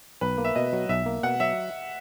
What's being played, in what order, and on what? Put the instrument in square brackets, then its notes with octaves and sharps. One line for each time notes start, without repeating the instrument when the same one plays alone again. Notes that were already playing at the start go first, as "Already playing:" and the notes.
[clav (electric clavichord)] B1 [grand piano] B4
[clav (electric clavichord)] A#3
[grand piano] E5
[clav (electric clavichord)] B2 [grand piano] D#5
[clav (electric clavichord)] F#3
[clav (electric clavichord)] B1 [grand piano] E5
[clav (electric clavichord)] A#3
[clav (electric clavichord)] B2 [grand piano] F#5
[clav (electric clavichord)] F#3 [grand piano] E5